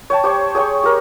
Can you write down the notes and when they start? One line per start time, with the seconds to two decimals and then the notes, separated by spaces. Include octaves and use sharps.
0.10 C#5 G5 A5
0.24 G4 C5 C#5
0.55 G#4 C#5 G5 C#6
0.83 G4 A#4